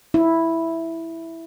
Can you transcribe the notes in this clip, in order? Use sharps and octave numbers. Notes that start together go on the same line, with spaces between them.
E4